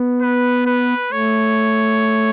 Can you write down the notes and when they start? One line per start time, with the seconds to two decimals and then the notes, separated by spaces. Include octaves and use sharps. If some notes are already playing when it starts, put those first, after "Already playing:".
Already playing: B3
0.22 B4
0.66 B4
1.12 A3 C#5